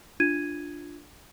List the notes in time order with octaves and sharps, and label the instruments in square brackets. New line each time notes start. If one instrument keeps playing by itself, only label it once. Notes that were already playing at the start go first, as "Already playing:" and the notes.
[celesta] D4 F4 G#6 D#7